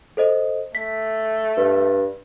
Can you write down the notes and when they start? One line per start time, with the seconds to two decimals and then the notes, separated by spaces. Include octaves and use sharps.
0.17 A4 C5 D#5
0.75 A3 B6
1.57 G2